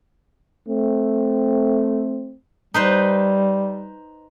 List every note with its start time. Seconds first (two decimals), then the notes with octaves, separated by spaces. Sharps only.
0.68 A3 C4
2.74 G3 D#4 B4 C5